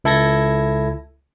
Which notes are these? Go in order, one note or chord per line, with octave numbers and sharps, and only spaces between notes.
C#2 E4 A4 G#6 A#6